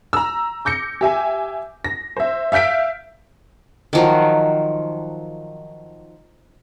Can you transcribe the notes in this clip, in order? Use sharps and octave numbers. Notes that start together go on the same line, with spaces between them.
A#5 E6
D6 G6 A#6 C#7
G4 E5 G#5
A#6
C5 E5
E5 F5 G6 B6 D7
D#3 F3 F#3